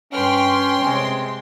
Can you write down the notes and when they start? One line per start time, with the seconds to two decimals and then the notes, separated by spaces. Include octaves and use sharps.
0.13 G2 C#4 B4 G5 C6 F6
0.79 C3 G#3